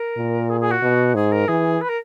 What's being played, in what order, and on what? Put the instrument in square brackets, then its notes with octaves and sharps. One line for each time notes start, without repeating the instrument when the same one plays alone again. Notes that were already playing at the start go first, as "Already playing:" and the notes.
Already playing: [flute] A#4
[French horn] A#2
[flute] G#4
G#4
F#4
[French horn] B2
[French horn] G#2 [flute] G#4
[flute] A#4
[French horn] E3 [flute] G#4
[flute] B4
A#4